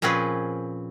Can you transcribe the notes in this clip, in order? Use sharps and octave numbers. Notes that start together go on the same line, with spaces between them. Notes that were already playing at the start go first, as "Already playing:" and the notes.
A#2 F3 C4 C#4 G#4 B4